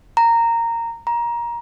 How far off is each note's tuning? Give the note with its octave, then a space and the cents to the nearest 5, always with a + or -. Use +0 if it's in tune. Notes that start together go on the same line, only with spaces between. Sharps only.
A#5 -10
A#5 +20